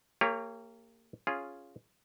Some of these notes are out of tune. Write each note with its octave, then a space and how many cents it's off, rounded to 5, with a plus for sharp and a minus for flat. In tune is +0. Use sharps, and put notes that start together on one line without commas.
A#3 -25 G4 +30 C#5 +0
C#4 +0 F4 +0 G#4 +0